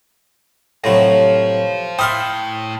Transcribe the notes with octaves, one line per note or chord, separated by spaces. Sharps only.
A2 C3 F#3 C5 C#5 F5 A#6
A2 C5 E5 G5 C6 D#6 F6